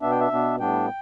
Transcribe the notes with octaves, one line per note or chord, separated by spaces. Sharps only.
B2 B3 D4 E5
G5
E5
B2 B3 D4
A2 G3 B3 D4 G5